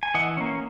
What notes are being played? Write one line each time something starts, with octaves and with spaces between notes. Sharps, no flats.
G#5
E3 D#5 F#5
A#3 C#4